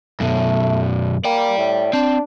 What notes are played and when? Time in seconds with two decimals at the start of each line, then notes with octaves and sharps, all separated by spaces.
0.20 F#2 B2 A3
1.25 A#3 D5 G5
1.58 A2
1.93 C4 D4